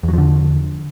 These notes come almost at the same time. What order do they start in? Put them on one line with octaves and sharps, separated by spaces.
E2 F#3 F3 D3